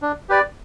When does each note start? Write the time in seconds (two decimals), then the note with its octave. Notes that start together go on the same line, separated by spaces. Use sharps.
0.02 D4
0.29 G4 B4 D5